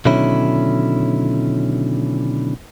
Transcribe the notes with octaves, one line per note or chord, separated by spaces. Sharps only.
B2 D3 D#3 F#3 C#4 E4